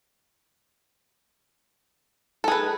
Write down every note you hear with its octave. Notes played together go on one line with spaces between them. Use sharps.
G#4 A4 B4